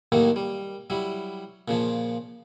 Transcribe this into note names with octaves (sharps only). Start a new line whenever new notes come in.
D#2 A2 D#3 F#3 A#3
G3
F#3 G3 E4
A#2 C#3 F3